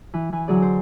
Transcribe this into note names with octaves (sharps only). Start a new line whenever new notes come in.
E3
E3 G#5
D3 F#3 G#4 D5
C5